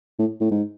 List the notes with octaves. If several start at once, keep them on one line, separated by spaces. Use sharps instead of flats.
A2
A2
G#2